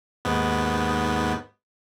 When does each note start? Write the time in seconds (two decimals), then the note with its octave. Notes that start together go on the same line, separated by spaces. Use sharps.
0.25 D#2 G#2 B3